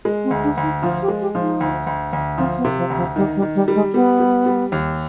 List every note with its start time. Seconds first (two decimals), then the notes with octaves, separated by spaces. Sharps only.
0.05 G#3
0.24 C4
0.31 D2
0.44 D4
0.57 D2
0.63 D#4
0.82 F3 F4
1.02 G4
1.08 G#3
1.21 G4
1.35 F3
1.41 D#4
1.60 D2
1.87 D2
2.13 D2
2.38 F3 C4
2.58 B3
2.65 C3
2.77 F3
2.90 D2
2.97 F3
3.16 D#3 G3
3.36 G3
3.42 D#3
3.55 G3
3.68 G3
3.75 G#3
3.94 G3 B3
4.20 G3
4.46 G3
4.72 D#2